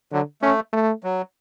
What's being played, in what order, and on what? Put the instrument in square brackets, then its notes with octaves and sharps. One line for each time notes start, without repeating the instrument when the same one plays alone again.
[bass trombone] D3 [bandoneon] F#3
[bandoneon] A3 [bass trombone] C#4
[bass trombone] A3
[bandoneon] F#3